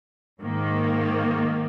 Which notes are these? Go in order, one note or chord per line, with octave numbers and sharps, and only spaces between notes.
G#2 D#3 A#3